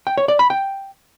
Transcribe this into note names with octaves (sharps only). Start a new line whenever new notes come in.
G5
C#5
D5
B5
G5